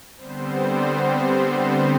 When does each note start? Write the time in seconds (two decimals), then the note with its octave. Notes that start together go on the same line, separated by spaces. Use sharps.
0.17 D3 G3 B3 C4 C5
1.41 C4 C5